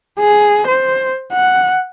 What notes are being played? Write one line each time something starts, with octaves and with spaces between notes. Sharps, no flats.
G#4
C5
F#5